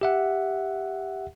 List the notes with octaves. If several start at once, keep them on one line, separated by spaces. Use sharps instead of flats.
G4 E5 F#5